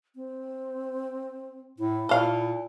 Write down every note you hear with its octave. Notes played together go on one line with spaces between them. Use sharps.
C4
A2 E4
A#2 A4 F5